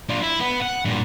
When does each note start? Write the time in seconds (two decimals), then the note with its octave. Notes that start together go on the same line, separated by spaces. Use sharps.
0.09 D4 F4
0.22 E4
0.40 B3
0.62 F#5
0.85 G2 A#2